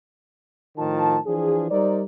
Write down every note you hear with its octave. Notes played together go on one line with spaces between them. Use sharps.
A2 D#3 F3 F4 A5
E3 F3 D4 G#4
G3 D#4 A#4 C5 D5